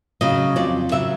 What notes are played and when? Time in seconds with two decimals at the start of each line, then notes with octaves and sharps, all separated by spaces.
0.21 C#3 F#3 D#5
0.56 F2 D5
0.91 C#3 F#3 E5